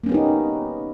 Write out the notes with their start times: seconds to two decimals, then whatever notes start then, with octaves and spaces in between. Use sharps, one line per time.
0.04 A#3
0.06 C#4
0.09 B3
0.12 G4
0.14 D#4